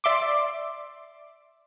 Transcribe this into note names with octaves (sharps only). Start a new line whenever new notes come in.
D5 E5 C6 D6